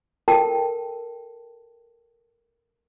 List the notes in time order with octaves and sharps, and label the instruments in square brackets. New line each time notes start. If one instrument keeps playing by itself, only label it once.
[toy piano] A4 A#4 G5 A5